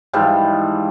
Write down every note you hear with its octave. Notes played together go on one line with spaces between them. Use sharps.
G#2 E3 F3 G3